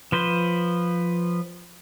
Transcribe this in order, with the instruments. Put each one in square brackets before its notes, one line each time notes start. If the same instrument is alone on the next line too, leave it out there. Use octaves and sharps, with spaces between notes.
[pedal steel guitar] F3 B4 C5